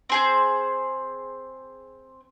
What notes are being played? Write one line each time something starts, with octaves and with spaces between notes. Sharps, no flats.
C4 G#4 C5